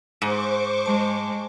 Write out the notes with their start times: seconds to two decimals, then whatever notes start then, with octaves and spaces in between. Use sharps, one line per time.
0.22 G#2 C5 C#6 D6
0.86 G#3 A5